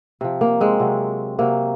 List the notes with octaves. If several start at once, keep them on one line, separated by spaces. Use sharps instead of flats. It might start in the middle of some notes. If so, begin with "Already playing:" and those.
C3 F3
A#3
G#3 C4
C3 F#3
C3 F#3 A#3